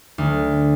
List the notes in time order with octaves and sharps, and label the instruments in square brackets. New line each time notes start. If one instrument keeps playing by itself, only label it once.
[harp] D2